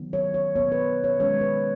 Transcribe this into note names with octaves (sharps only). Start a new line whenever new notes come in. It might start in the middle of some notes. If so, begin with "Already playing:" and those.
Already playing: D#3 F#3 B3
C#5
C#5
B2 B3 C#5
B4
C#5
D#3 G#3 C#4 C#5
B4